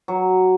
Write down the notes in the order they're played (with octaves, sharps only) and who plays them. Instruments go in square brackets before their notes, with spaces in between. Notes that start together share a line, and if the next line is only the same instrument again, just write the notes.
[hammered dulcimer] F#3